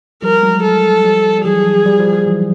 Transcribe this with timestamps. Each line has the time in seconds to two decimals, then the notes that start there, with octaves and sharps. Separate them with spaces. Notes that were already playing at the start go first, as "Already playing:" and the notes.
0.22 F3 G3 A#4
0.43 F#3 G#3
0.63 A4
1.04 F3 G3
1.39 G3
1.45 E3 F#3 G#4
1.86 F3 G3
1.99 F3 G3
2.13 F3 G3
2.27 E3 F#3